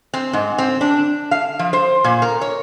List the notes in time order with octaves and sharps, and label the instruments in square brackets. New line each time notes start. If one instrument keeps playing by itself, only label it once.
[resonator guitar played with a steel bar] C4
G#2
C4
D4
F5
F3
C5
A#2
A#4
C#5